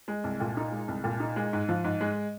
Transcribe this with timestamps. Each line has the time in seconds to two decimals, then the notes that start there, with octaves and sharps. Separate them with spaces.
0.08 G#3
0.24 C2
0.40 A#2
0.57 D#4
0.72 G#3
0.88 C2
1.04 A#2
1.20 D#4
1.36 G#3
1.53 G#2
1.68 F3
1.84 G#2
2.01 G#3